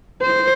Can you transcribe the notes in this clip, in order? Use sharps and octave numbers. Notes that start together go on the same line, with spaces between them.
C5